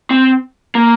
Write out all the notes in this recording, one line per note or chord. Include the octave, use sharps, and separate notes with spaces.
C4
A#3